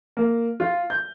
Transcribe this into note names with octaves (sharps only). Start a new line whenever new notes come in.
A#3
F4
G6